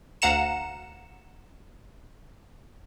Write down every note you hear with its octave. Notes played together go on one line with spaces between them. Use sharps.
D2 F5 F#5 A#5 C#7 E7